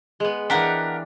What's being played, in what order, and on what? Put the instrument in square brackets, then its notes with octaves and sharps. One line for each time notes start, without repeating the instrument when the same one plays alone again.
[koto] G#3 B3
[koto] E3 D4 [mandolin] G4 A#4 F#5